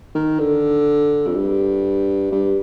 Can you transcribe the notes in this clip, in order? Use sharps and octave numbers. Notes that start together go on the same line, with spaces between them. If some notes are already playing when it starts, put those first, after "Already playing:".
D#3
D3
F2
G2
G2